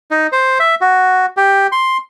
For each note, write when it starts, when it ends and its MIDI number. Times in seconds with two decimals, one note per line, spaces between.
0.11 0.27 63
0.32 0.58 72
0.60 0.75 76
0.81 1.26 66
1.37 1.67 67
1.72 1.97 84